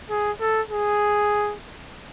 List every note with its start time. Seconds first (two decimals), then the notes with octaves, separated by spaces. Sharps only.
0.10 G#4
0.40 A4
0.70 G#4